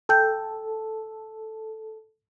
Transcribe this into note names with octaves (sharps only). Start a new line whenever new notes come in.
A4 G5 G6